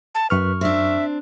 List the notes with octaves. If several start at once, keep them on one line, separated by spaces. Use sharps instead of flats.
A5
F#2 B4 C#6 F6
C4 D4 E5